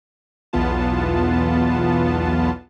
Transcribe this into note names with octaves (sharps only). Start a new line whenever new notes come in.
B1 E2 E3 B3 F4 A5